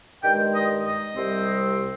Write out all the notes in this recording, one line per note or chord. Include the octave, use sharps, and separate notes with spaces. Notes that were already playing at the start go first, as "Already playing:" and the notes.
G2 D#3 G#3 G5
D#5
D#5
C2 C3 G3 C4